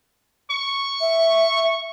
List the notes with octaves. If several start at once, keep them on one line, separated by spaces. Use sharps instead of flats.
C#6
E5